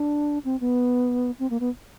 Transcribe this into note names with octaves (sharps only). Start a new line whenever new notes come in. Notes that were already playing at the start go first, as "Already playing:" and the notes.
Already playing: D4
C4
B3
C4
A#3
B3